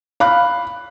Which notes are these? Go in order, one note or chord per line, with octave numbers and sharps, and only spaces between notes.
F5 B5 F#6